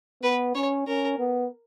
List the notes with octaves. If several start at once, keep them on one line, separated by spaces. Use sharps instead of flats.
B3 B4
C#4 C#5
C#4 A#4
B3